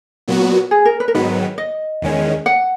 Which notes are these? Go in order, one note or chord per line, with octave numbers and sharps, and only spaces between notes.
A#2 F#3 B3 F#4
G#4
A#4
B4
A#4
G#2 D#3 F#3 B3 B4
D#5
E2 D#3 G#3 C#4
F#5